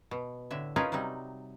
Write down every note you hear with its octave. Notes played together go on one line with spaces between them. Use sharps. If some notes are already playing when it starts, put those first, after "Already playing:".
B2
A2 D3 E5
C#4 D#4 F4 G#4 A#4 B4
C3 F#3 G3 D#4